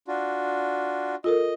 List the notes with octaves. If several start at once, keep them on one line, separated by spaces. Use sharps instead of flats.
D4 F4 F#4
F4 A4 A#4 D#5